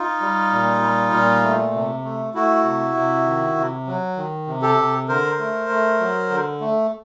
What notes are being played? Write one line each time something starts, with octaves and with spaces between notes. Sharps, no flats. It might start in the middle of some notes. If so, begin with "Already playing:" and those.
Already playing: D#4 F4
G3
A#2
G3
A#2
A3
C3
A3
A3 E4 F#4
C3
C3
D#3
C3
F#3
D#3
C3
G4 A4
C3
D3 A#4 C5
A3
A3
F#3
D3
A3